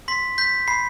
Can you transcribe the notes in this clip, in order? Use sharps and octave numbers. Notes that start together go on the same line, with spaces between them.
C6 B6
G6 B6
B5 C7